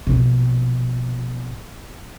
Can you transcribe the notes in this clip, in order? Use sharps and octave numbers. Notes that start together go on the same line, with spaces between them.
A#1 B2